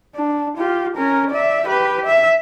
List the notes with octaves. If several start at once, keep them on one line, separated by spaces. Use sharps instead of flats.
D4
F4 G4
C#4 A#4
D5 E5
G4 B4
E5